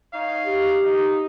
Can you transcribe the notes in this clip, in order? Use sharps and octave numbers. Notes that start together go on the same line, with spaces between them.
D#4 C#5 F5
G4
D#4